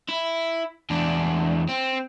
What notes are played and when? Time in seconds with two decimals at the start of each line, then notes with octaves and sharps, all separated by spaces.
0.09 E4
0.90 E2 D4
1.69 C4